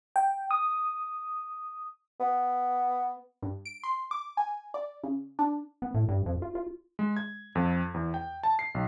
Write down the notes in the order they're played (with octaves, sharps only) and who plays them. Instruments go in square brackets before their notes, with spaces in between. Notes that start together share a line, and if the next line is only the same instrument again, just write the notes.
[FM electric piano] G5
D#6
[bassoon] B3
[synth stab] G2
D7
C6
D6
G#5
D5
C#3
D4
[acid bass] B3
A2
G2
F2
F4
F4
[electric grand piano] G#3
G#6
F2
E2
G5
A5
C7
B1